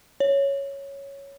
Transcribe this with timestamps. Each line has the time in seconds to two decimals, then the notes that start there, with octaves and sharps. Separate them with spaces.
0.20 C#5